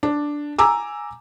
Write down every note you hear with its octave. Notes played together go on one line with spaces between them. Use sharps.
D4
G#5 A#5 D6 E6